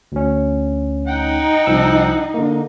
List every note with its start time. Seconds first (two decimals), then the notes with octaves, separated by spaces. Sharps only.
0.12 D2 C#4
1.07 D#4 F#5 G5
1.67 C2 F3 E6
2.34 D3 A#3